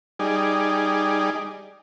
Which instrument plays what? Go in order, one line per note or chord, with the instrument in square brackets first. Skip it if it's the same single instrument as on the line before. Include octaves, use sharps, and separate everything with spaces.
[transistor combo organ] G3 D#4 G#4 D5